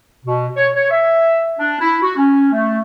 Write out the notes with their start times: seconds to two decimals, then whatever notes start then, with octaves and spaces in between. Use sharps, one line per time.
0.24 B2
0.56 C#5
0.75 C#5
0.90 E5
1.59 D4
1.80 E4
2.02 F#4
2.17 C#4
2.51 A3